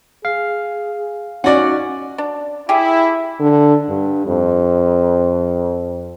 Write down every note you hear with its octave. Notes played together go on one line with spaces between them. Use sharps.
G#4 F5
C#4 D#4 F#4 D5 F#5
D4
E4 G4 G#4
D3
G2
F2